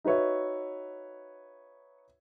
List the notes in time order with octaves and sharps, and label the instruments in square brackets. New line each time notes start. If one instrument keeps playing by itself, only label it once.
[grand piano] D#4 F#4 B4 C#5 E5